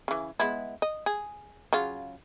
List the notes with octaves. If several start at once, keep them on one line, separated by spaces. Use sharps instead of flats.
C#3 E3
G#3 B3 E4
D#5
G#4
C#3 F#3 F4